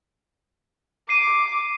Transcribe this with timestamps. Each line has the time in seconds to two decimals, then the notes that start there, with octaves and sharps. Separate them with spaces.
1.09 D6 C7 D#7